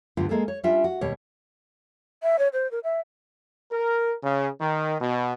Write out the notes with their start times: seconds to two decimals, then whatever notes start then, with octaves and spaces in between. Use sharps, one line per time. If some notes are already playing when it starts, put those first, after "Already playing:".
0.17 D2 G2 D3 B3 F4
0.29 G#3 A#3 G#4 A4
0.48 C#5
0.64 G3 C#4 D4 F4 E5
0.84 F#4
1.01 D#2 B2 G3 C#5
2.23 E5
2.39 C#5
2.53 C5
2.71 A#4
2.84 E5
3.72 A#4
4.23 C#3
4.60 D#3
5.00 B2